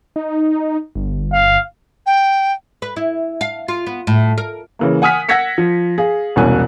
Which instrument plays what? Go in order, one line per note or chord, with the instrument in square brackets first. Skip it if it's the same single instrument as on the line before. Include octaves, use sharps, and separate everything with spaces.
[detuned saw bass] D#4
G1
[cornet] F5
[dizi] G5
[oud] B4
E4
F5
F4
B3
A2
A#4
[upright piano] C#3 E3 A#3
F#5 G#5 D#6 F6 B6
F#5 E6 G#6 A#6 B6 C#7
F3
G#4 F5
E1 C2 B2 C#4 G#5 F#6